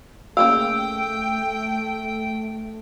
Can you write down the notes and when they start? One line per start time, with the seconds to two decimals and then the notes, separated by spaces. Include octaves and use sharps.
0.37 C#3 A3 A#3 F5 G5 E6